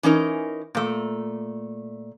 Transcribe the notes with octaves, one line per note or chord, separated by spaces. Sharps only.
E3 C#4 D#4 A#4
A#2 A3